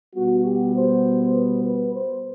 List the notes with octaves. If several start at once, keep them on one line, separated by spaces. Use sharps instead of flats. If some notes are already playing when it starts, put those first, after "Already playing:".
B2 G3 B3 F#4
G4
C5
B4
B4
C5